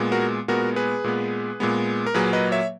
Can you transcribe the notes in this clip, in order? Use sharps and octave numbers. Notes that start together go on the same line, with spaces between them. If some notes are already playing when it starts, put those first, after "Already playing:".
Already playing: A#2 G#3 B3
F#4 A#4
A#2 G#3 B3 F#4 A#4
G#4 B4
A#2 G#3 B3
A#2 G#3 B3
A#4
A#2 F#3 A#3 G#4 B4
B4 D#5
C#5 E5